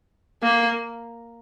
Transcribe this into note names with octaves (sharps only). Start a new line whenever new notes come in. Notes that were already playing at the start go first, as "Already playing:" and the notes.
A#3